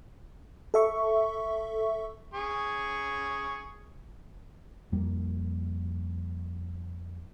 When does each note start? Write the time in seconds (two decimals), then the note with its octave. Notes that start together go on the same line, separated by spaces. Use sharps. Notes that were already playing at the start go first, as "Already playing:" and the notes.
0.74 A4 E5 C#6
2.34 G#4 C#6
4.92 F2 G3 A#3